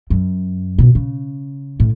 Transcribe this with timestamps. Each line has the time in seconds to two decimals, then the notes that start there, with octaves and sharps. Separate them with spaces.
0.10 F#2
0.79 B2
0.95 C#3
1.80 A2